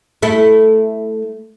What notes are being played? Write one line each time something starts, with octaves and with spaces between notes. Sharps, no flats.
A3 E4